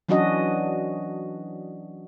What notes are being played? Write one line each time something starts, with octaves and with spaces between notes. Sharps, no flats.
E3 F#3 C#4 D4 F#4 D#5